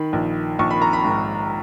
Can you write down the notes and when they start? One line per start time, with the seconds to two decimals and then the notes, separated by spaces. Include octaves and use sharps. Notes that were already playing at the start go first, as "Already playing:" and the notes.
Already playing: D#3 B5
0.13 A#1
0.59 A#1 C#6
0.71 B5
0.82 A#5
0.93 B5
1.05 G#2